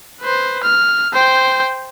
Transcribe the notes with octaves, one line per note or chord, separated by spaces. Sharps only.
B4 C5
F6
C5 G5